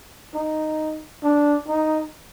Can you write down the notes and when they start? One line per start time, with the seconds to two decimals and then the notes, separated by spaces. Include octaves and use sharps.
0.34 D#4
1.23 D4
1.68 D#4